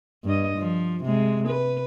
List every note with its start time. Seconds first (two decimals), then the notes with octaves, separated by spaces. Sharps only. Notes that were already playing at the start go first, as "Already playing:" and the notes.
0.25 G2 D#5
0.58 F3
1.03 C3 G#3
1.48 B4